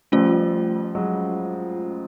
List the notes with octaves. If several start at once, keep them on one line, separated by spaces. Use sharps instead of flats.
F3 G3 A3 C#4 F4
F#3 G#3